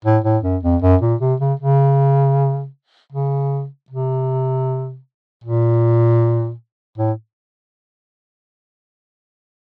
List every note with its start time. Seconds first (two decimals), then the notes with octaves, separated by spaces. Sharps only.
0.05 A2
0.24 A2
0.43 F#2
0.63 F2
0.82 F#2
1.01 A#2
1.21 C3
1.40 C#3
1.59 C#3
3.12 C#3
3.90 C3
5.44 A#2
6.98 A2